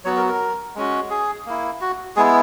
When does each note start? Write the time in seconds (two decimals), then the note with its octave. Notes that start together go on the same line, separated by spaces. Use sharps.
0.04 F#3 B3 F#4 C#5
0.17 A#4
0.28 A#4
0.75 G#3 C#4 F#4
1.10 G#4
1.46 A#3 E4
1.81 F#4
2.16 G#3 B3 E4 G#4